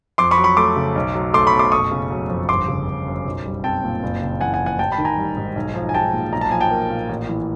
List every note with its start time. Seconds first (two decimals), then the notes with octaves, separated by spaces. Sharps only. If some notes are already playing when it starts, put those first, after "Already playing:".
0.18 F2 C6 D6
0.31 B5 C#6
0.38 F#3
0.44 B5 C#6
0.57 A3 C6 D6
0.76 C#3
0.95 B1
1.15 F#3
1.34 A3 C6 D6
1.47 B5 C#6
1.53 B2
1.59 C6 D6
1.72 F#1 C#6 D#6
1.91 C#3
2.10 F#3
2.29 F2
2.49 G1 C6 D6
2.68 C#3
2.87 G1
3.07 F#2
3.26 B1
3.45 G3
3.64 C4 G5 A5
3.83 A#2
4.03 F#1
4.22 C#3
4.41 E3 F#5 G#5
4.54 F#5 G#5
4.60 F2
4.66 F#5 G#5
4.79 A1 G5 A5
4.92 A5 B5
4.98 D#3
5.05 G#5 A#5
5.17 G3
5.37 G#2
5.56 B1
5.75 F3
5.89 G#5
5.94 G#3 G5 A5
6.13 A#2
6.32 B1 A#5
6.41 A5
6.51 F3 G#5
6.60 G5 A5
6.71 A#3
6.90 A#2
7.09 A1
7.29 E3